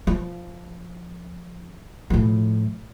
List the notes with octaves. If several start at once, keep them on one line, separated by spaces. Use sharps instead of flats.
F3
A2 F3